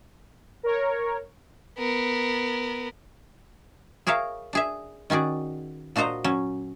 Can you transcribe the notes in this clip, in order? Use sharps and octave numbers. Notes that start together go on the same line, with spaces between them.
A#4 C#5
B3 A#4
G#4 A#4 C#5 E5 F5
D4 G#4 E5
D#3 C#4 F#4 G#4 D5
A#2 D4 F#4 C5 D#5 A#5
F#3 C#4